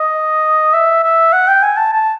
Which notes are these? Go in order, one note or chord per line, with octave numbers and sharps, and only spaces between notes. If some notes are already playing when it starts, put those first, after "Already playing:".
Already playing: D#5
E5
E5
F#5
G5
G#5
A5
A5